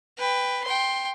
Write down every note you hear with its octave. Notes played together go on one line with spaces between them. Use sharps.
B4 G5
G5 C6